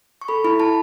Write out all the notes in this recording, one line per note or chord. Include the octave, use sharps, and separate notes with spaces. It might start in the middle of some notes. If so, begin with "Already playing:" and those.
C#6
A4 B5
E4 B5
E4 A5